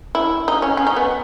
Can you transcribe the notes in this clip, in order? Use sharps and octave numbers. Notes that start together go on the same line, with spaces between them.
E4
D#4
C#4
C#4
D#4
B3